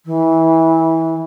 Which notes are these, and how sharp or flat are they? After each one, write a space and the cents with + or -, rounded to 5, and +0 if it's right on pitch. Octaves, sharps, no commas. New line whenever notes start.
E3 -20